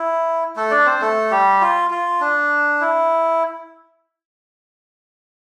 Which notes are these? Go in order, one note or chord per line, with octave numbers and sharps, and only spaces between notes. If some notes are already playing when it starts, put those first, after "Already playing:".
Already playing: E4
A3 A4
D4 D5
C4 C5
A3 A4
G3 G4
F4
F4
D4
E4